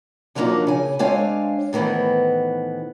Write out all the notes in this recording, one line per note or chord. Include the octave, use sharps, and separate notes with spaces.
D3 F3 F#3 A#3 D4 D#4
C#3 G#5
G#3 C4 D4 C#5 F5 G#5
A2 D#3 E3 B3 C4